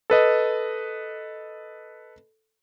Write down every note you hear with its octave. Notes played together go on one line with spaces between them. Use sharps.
A4 B4 D#5